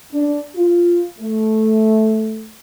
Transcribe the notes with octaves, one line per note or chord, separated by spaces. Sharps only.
D4
F4
A3